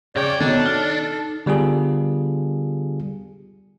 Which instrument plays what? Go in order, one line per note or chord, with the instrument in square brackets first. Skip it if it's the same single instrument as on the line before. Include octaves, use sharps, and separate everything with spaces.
[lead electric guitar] F2 G5 [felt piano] C#3 D6 [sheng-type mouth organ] C#5 D5
[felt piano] B2 D#3 [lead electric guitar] D4 [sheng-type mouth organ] A4 [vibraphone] C#5 D#5
[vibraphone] D#4 [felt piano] F6
[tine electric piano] D3 G3 B3 F4 G#4 A4